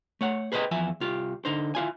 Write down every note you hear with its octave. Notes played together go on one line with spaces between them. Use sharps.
A3 C#5 F#5
G#4 B4 C5 D5 D#5 G5
E2 F3 E5 G#5
C2 F4 G4
D3 D#4 C5
E4 F4 G#5